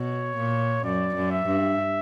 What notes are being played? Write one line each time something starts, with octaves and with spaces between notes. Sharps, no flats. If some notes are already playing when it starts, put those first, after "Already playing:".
Already playing: B2 C#5
A#2
F#2 D5
F#2
E5
G2